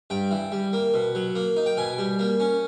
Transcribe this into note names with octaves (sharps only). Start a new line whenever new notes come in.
G2 G5
E3
G3
A#3
B2
F#3
A#3
D#4
G5
B2 G#5
G3
A#3
C#4